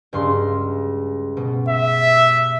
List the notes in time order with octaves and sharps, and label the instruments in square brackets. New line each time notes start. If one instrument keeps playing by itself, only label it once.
[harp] C#2 G2 C6
B2
[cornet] E5